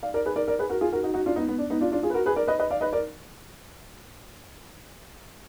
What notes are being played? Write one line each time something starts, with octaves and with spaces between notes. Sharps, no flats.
D5 F5
A#4 D5
G#4 B4
A#4 D5
A#4 D5
G#4 B4
F#4 A#4
F4 G#4
F#4 A#4
D#4 F#4
D#4 F#4
D4 F4
B3 D#4
B3
D4
B3 D#4
D4 F4
D4 F4
F4 G#4
B4
F#4 A#4
G#4 B4
A#4 D5
B4 D#5
B4 D#5
D5 F5
B4 D#5
A#4 D5